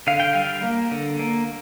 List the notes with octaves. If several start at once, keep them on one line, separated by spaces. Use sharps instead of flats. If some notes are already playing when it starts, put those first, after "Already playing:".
D3 F5
G5
G3 F5
A#3
D3
A#3